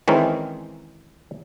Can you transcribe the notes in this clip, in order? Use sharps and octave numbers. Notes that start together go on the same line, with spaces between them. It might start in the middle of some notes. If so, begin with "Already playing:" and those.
D#3 E3 G#3 C4 C#4 D#4